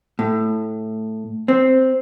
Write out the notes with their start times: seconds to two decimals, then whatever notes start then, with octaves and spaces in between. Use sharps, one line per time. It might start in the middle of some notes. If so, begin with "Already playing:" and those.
0.19 A2
1.48 C4